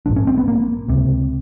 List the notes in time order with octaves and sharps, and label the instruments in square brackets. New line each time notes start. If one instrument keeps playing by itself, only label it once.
[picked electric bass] A#1 G#2 D4
C#4
C4
B3
A#3
C#2 C3